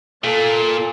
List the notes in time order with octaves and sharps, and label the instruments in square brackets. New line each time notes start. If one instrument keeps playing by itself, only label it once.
[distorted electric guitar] A#2 [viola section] A4 F5 A5